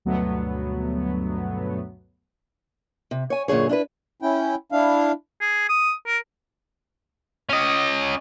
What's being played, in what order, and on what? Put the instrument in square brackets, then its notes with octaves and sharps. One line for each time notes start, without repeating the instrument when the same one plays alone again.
[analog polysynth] D2 G2 B2 F#3 A3 B3
[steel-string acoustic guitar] C3
C#5 G#5
F#2 A#2 D3 G#4 C#5
D4 E4 G#4 B4
[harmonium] C#4 E4 G5
D4 E4 F5
[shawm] G#4
D#6
A#4
[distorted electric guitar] C#4 D#5